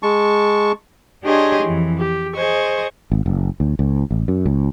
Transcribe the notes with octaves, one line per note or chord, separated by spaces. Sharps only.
G#3 A5 C#6
D4 G4 G#4 C#5 D#5 C6
F2 E3
G4
G#4 C5 D#5 C#6
G#1
F#1
D2
C#2
A1
F#2
C#2